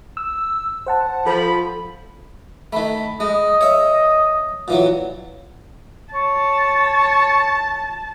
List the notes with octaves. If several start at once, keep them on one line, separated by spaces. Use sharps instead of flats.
E6
C5 F#5 A5
F3 A4 B5
D#3 A3 B5
G#3 D#5
C#5 E5
A#2 E3 F#3
C#5 A5